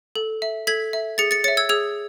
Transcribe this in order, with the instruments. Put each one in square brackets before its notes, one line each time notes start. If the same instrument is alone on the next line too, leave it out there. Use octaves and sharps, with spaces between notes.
[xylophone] A4
E5
A4 G#6 B6
E5
G#4 A6 C#7
A6 C#7
C#5 E5 A6 C#7
E6 G#6
G#4 E6 G#6